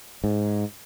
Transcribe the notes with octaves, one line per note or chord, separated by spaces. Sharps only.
G#2